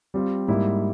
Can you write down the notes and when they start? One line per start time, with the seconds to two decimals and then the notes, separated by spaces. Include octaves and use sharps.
0.14 G3 C4 F4
0.48 G#2 G3 A#3 E4